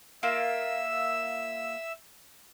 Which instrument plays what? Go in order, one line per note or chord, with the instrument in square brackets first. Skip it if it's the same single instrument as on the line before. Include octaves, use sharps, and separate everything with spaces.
[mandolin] A#3 F4 [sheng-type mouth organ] E5 E6